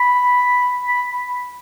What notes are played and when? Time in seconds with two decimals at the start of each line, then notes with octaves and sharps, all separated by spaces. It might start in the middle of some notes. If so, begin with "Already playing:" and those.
Already playing: B5
0.88 B5